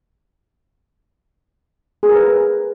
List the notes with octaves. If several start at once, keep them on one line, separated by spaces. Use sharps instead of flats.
G#4
A#4
B4